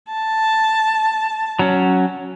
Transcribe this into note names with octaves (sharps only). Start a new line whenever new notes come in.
A5
F#3 C#4